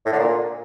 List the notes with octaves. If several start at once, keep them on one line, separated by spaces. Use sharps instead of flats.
A2
D3
A#2